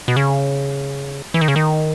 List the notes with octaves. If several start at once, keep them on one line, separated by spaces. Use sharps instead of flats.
B2
C#3
E3
D#3
C#3
D#3